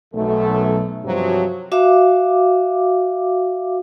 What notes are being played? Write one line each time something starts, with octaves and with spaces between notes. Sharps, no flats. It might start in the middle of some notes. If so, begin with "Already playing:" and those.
B1 F#2 A3
G2 C3 F3 F#3
F#4 E5 F5 D6